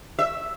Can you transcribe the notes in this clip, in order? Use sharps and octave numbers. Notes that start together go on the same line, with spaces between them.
E5